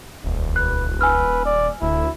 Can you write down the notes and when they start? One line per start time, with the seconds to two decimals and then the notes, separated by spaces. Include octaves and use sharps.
0.24 D#1 C#2
0.56 B4 F#6
1.01 B4 G#5 E6 F6
1.46 D5
1.82 D1 D2 E4